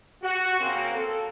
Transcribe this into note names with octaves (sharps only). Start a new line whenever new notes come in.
F#4
C#3 A#3 C4
A4